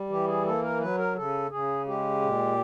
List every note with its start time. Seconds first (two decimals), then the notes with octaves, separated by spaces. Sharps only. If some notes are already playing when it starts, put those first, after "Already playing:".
Already playing: G3
0.09 E3 G4
0.27 G#4
0.45 A#3 A4
0.62 A#4
0.80 F#3 B4
0.98 A#4
1.15 C#3 A4
1.50 C#3 G#4
1.86 G#3 G4
2.22 A#2